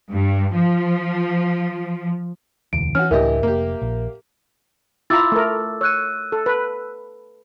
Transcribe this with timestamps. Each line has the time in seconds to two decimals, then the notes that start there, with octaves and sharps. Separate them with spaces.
0.11 G2
0.55 F3
2.73 E1 D2 E3 D7
2.95 E3 C#4 F#4 F6
3.11 C#2 A2 E3 D4 G4 A#4 D#5 E5
3.43 F1 A#3 G4
3.82 A#1
5.10 E4 F4 A#5 D6 E6 A6
5.32 A3 A#4
5.81 C#5 E6 F#6 D#7
6.32 A4
6.46 B4